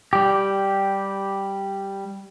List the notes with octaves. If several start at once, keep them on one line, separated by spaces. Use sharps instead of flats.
G3 G4